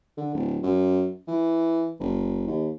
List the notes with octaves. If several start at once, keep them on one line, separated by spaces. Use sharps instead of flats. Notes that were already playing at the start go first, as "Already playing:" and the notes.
D3
D1
F#2
E3
F#1
D#2